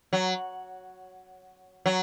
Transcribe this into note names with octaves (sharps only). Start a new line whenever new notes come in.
F#3
F#3